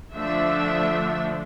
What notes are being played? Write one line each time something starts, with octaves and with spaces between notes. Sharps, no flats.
D3 F3 A3 D4 E5